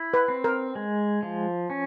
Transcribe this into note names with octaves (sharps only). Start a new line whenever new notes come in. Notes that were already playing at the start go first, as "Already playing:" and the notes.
Already playing: E4
B4
C4
A#4
G#3
F3
C#4